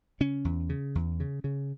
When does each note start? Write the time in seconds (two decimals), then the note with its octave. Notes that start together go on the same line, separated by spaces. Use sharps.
0.20 C#3 C#4
0.45 E2
0.69 C#3
0.95 E2
1.20 C#3
1.44 C#3